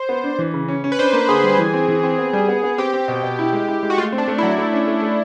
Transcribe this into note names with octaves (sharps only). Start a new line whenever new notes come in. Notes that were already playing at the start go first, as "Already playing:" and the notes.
Already playing: C5
B3
D4
E3
C#3
C#4
C#4
B4
D4 C5
A#3
D3 G#4
G3
E3
C4
E3
C4
B3
G3
B3
B3
C4 G4
C4
B2
B2
E4
G#3
E4
G#3
F#4
A3 F4
C4
D4
A3
F#3 E4
A3
C#4
A3
A3